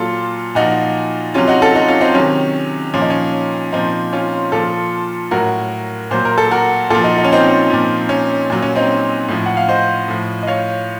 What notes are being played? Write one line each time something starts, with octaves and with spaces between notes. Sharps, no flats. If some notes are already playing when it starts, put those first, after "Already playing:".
Already playing: A#2 F#3 F4 A4
A#2 F3 D#4 F#4
C3 F#3 C#4 F4
D#4 F#4
F4 A4
D#4 F#4
C#4 F4
C4 D#4
C3 D#3 F#3 C#4
A#2 F3 C#4
D#4
C#4
A#2 F3 C4 D#4
C#4 F4
A#2 F3 F4 A4
A2 F#3 F#4 A#4
A#2 F#3 C5
A#4
A4
F#4 A#4
A#2 F3 F4 A4
D#4 F#4
D#4
C#4
C4 D#4
A#2 F3
C#4
A#2 F#3
C#4
C4 D#4
A2 F3
F#5
F5
C5 D#5
A2 F3
D#5
C#5 F5